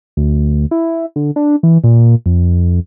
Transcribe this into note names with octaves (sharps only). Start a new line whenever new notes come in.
D2
E4
D3
D4
E3
A#2
F2